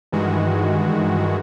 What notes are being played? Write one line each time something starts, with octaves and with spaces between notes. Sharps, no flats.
G2 D#3 E3 G#3 F#4